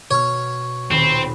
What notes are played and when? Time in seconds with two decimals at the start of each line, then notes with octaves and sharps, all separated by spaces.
0.11 B2 C#5 F6
0.91 D#1 C4 B5